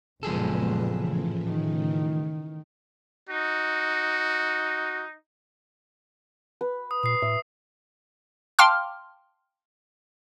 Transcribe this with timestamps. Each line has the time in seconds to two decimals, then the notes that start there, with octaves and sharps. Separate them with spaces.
0.23 F#1 A#2 F3 G#3 B3 G#4 A4 B4
0.94 A2 C#3 E3
1.48 D#3
3.29 D#4 F#4
6.61 B4
6.91 D#6
7.03 A#2 D#6 C7
7.22 A2 E5
8.59 F5 G5 A5 C6 D6 F6